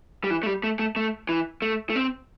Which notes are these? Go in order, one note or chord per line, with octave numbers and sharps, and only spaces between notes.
G3
E3
A3
G3
A3
A3
A3
E3
A3
A3
C4